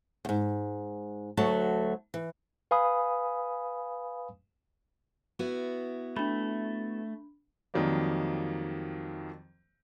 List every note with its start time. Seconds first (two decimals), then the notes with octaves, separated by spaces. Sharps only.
0.25 E2 G#2
1.37 D2 F#3 A3 A5
2.14 E3
2.71 B4 F5 G#5 B5 D#6
5.39 B3 E4 F#4
6.16 A3 D4 B5
7.74 F2 D#3 F#3 G3 A#3